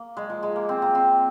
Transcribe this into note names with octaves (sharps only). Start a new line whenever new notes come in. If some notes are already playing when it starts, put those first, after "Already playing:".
Already playing: A#3
G#3
F3
G#3
A#3
C4
A#3
C4